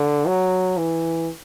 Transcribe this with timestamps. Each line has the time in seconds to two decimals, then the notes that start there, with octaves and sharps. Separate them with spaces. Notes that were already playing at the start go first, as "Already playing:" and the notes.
Already playing: D3
0.27 F#3
0.77 E3